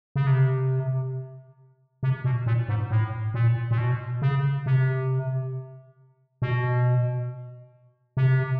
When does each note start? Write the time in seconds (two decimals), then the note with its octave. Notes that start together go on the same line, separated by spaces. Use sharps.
0.16 C#3
0.27 C3
2.03 C3
2.24 B2
2.46 A#2
2.69 G#2
2.91 A2
3.34 A#2
3.71 A#2
3.78 B2
4.22 C#3
4.66 C3
6.42 B2
8.17 C3